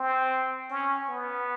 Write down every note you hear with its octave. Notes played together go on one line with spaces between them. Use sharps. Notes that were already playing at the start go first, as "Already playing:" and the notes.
Already playing: C4
C#4
B3